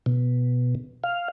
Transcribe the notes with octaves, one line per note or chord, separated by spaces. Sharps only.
B2
F5